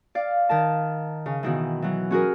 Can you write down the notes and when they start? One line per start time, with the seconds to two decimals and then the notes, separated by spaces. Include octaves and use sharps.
0.15 D5 F5
0.49 D#3 A#4 A5
1.26 C#3
1.43 B2 D#3 E3
1.82 E3 F#3
2.11 C#4 F#4 G#4 A#4